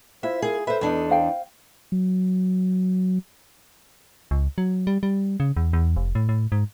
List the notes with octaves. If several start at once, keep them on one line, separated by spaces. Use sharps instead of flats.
E4 F4 C5 E5
G#4 A#4
A4 B4 C5 E5
E2 D4 D#4
C5 F5 G5
F#3
C#2
F#3
G3
G3
C#3
E2
E2
F1
A2
A2
G#2